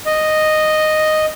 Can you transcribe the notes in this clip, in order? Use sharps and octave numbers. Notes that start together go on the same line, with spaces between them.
D#5